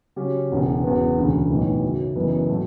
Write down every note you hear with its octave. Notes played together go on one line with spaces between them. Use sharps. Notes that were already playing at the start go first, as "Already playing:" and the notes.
C#3 F#3 C#4 G4
E1 E2 C#3
E2 C#3 F#3 B3
E1 D2 C#3
B1 A2 E3 B3
F#2 C#3 F#3
F#1 F#2 E3 B3
A2 F#3 A3